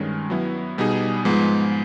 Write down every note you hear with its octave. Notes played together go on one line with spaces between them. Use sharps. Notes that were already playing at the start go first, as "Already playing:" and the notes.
Already playing: G2 D#3 G#3 C#4
F#3 B3 E4
B2 G3 B3 D#4 G#4
G#2 F3 G#3 B3